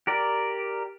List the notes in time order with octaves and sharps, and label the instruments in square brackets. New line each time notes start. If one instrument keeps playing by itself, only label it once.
[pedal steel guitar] G4 A#4 D5